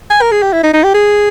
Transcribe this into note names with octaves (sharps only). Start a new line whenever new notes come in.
G#5
A#4
G#4
G4
E4
D#4
D#4
G4
G#4